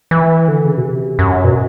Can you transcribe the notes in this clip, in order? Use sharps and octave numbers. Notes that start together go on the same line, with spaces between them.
E3
D3
C#3
B2
C3
F#2
B2